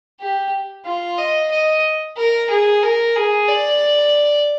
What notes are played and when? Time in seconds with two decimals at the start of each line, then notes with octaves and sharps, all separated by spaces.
0.20 G4
0.85 F4
1.18 D#5
1.51 D#5
2.17 A#4
2.50 G#4
2.83 A#4
3.16 G#4
3.48 D5